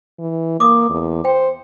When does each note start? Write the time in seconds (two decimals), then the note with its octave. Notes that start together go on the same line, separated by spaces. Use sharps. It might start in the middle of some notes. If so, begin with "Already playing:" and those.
0.20 E3
0.60 A#3 D6 D#6
0.90 E2
1.25 C5 G5